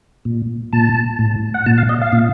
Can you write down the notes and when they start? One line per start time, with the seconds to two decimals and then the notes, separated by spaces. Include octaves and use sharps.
0.25 A#2
0.73 A#2 A5
1.19 A2
1.54 F#5
1.66 A#2 A5
1.78 F5
1.89 D#5
2.02 F5
2.13 A#2